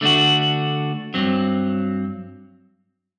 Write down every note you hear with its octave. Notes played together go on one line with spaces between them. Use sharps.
D3 A3 D4 F#4
G2 F#3 C4